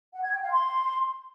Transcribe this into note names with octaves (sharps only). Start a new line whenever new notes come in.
F#5
G#6
G5
F5
C6